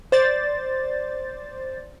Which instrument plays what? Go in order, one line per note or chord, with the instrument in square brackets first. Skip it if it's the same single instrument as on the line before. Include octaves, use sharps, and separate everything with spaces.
[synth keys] C5 D5 A6